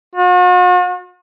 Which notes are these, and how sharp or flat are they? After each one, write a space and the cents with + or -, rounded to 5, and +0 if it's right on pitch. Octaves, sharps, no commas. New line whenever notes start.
F#4 -45